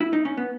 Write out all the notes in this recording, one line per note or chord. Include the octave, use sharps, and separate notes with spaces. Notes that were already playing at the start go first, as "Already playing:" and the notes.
E4
D#4
C#4
B3